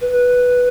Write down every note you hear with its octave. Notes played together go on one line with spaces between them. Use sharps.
B4